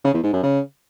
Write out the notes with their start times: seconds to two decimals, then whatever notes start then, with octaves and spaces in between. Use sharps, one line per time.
0.04 C#3
0.14 E2
0.24 G#2
0.33 F#2
0.43 C#3